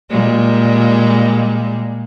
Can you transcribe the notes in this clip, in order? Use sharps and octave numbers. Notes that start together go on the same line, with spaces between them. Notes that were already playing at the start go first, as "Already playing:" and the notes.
A#2 G3 G#3